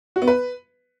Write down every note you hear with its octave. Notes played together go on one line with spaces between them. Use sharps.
F#4
B3
B4